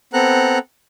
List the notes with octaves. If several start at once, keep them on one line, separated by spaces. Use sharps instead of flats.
B3 C4 A4 A#5 F#6